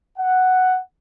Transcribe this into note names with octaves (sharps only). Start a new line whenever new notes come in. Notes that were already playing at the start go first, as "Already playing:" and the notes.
F#5